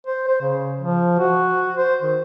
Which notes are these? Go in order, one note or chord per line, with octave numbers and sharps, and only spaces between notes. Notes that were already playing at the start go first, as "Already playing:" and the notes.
C5
C5
C#3
F3
F#4
C5
D#3